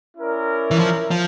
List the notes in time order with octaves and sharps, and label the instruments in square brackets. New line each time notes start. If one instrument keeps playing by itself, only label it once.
[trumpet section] C#4 E4 A#4 D5
[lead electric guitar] E3
F3
F3